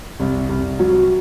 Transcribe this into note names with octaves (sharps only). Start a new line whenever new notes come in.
C2
C2
F#3